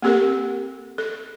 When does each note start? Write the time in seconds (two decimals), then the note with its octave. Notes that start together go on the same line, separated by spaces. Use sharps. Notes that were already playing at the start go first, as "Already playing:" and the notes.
0.02 A#3 C4 G4 A4 A#4
0.98 A4